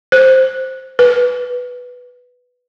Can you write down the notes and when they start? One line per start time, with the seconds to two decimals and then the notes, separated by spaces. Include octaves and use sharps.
0.12 C5
0.99 B4